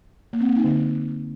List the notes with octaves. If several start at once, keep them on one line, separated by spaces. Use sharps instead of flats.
A#3
C4
A#3
D#4
D3